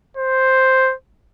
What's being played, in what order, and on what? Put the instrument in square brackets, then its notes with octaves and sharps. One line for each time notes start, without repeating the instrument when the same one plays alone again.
[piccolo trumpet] C5